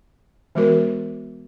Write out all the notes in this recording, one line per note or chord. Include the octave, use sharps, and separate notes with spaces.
E3 G#3 B3 F#4 A#4